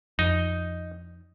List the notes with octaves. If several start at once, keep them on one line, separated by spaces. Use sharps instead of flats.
F2 D#4